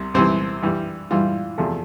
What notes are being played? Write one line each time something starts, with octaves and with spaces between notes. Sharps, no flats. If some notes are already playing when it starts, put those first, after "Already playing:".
Already playing: C2 C3
C2 C3 E3 C4
G2 E3 G3
G2 E3 G3 F4
E2 C3 F3 A3